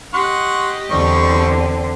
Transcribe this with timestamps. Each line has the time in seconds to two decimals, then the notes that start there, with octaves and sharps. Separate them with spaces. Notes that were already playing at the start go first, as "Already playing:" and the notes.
0.14 G4 D#5 F#5 C6 C#6
0.91 E2 D3 G3 C4 C#6